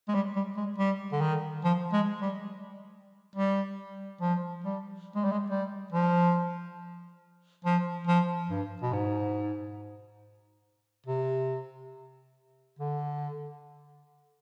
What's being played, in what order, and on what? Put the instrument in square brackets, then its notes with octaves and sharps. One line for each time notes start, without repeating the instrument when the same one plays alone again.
[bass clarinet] G#3
G3
G3
G#3
G3
D3
D#3
F3
G#3
G3
G3
F3
G3
G#3
G3
G#3
G3
F3
F3
F3
G2
B2
G#2
C3
D3